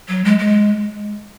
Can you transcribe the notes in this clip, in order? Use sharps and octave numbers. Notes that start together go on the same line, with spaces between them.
F#3
G#3
G#3